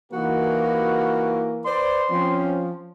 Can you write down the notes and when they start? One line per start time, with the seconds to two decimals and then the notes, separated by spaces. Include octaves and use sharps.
0.12 C3 E3 A#3 D#4 F#4 A#4
1.66 B4 C5 D5 C6
2.10 F3 C4 C#4